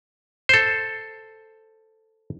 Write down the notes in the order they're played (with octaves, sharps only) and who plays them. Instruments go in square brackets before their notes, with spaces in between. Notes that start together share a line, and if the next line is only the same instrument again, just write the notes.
[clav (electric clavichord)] A4 C5